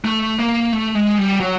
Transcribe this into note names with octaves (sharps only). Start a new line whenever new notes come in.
A3
A#3
A3
G#3
G3
F#3